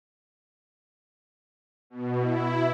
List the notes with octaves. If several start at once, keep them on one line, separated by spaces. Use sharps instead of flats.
B2
E4